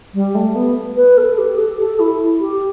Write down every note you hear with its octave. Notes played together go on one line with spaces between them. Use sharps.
G3
A3
B3
B4
A4
G4
A4
G4
A4
E4
G4